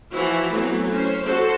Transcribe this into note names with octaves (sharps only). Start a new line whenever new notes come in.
E3 F3 E4 F#4
E3 F#3 A3 B3 C4
C#4 C5
F#4 A4 C5